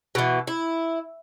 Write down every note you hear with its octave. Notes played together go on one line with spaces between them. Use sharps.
B2 E3
E4